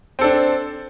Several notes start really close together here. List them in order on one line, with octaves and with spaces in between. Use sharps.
C4 A4 D4